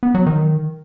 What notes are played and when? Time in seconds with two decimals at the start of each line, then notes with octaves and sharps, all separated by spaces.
0.03 B3
0.15 F#3
0.26 D#3